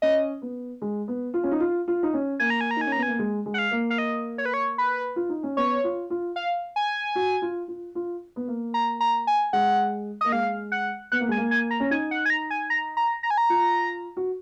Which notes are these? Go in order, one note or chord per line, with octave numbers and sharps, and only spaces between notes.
C#4 D#5
B3
G#3
B3
F4
C#4
D#4
F4
F4
D#4
C#4
A#3 G#5
A#5
G#5
A#5
D#4 G#5
C#4
B3 A#5
G#5
A#3
G#3
G#3
F#5
F5
A#3
F5
D#5
C#5
B4
C#5
B4
F4
D#4
C#4
B3 C#5
F4
F4
F5
G#5
F#4
F4
F4
F4
B3
A#3
A#5
A#5
G#5
G#3 F#5
A#3 D#5
G#3 F5
F#5
B3 F#5
A#3
G#3 G#5
A#3
G#5
A#5
C#4
D#4 G#5
F#5
G#5
A#5
G#5
A#5
A#5
A#5
G#5
A#5
F4
F#4